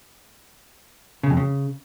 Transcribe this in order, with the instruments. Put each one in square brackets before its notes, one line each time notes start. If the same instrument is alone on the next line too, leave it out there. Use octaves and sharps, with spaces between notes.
[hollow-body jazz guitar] C#3
F2
C#3